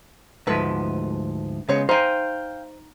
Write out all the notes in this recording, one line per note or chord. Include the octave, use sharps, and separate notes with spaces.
D2 G#2 F3 A3 B4
C#3 G#3 B3 C#5
D#4 C5 F5 G5 G#5